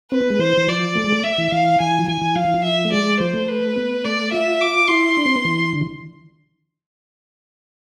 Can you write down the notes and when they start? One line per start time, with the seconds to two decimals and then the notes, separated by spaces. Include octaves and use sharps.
0.11 C4 B4
0.21 B3
0.30 G#3
0.39 E3 C5
0.57 E3
0.68 F3 D5
0.95 A3
1.04 G#3
1.12 A3
1.23 E5
1.38 E3
1.51 E3 F5
1.80 E3 G#5
1.99 F3
2.08 E3 G#5
2.22 E3
2.35 F3 F5
2.45 E3
2.54 F3
2.64 E5
2.85 A3
2.92 G#3 D5
3.20 F3 C5
3.34 A3
3.48 B4
3.76 B3
4.04 A3 D5
4.32 F4 E5
4.61 D6
4.88 E4 C6
5.17 D4
5.26 C4
5.36 B3
5.45 E3
5.73 D3
5.81 E3